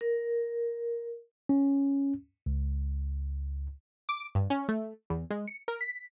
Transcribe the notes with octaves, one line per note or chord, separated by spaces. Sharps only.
A#4
C#4
C#2
D6
G2
C#4
A3
E2
G#3
C#7
A#4
B6